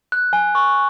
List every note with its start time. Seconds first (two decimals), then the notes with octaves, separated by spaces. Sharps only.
0.12 F#6
0.33 G#5
0.55 C#6